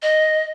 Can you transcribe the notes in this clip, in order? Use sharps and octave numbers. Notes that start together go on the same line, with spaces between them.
D#5